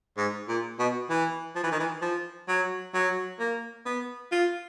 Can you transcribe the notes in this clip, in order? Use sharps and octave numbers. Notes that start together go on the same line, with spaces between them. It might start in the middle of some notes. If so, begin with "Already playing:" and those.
G#2
A#2
B2
E3
F3
E3
D#3
E3
F3
F#3
F#3
A#3
B3
F4